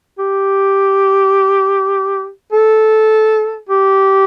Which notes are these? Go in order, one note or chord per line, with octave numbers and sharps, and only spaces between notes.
G4
A4
G4